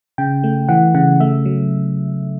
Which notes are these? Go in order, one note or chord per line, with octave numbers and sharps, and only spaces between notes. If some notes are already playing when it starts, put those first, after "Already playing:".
C#3 G5
A3
E3 F#5
C#3 F#5
A3 E5
F#3